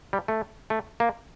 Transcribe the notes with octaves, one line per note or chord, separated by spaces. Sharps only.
G3
A3
A3
A#3